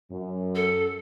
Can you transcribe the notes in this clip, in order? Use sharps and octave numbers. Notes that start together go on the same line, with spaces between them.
F#2
A4